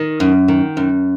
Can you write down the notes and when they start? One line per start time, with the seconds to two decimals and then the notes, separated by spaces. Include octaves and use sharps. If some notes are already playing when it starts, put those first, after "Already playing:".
Already playing: D#3
0.20 F#2
0.48 D#3
0.77 F#2